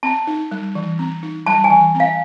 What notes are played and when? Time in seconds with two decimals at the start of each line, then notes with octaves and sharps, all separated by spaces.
0.03 C4 A5
0.27 D#4
0.51 G3
0.75 E3
0.99 C4
1.23 D#4
1.46 G3 A5
1.64 G#5
1.70 E3
1.95 C4
2.00 F5